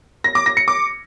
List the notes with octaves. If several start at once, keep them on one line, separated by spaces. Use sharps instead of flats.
A#6
D6
A#6
C#7
D6